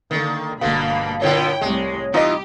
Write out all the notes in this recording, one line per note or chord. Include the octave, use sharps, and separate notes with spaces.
D3 D#3 A#3
G1 B2 D3 A#3 F5 B5
A#2 D3 B3 E4 C#5 G5
C2 A2 G#3
E3 D#4 F4 G4 D#5